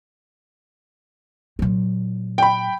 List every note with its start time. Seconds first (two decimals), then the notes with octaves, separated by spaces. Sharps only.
1.59 A#2 F#3
2.38 G5 B5